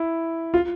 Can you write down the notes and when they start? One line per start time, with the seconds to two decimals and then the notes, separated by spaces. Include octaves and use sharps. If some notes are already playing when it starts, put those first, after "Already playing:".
Already playing: E4
0.54 F4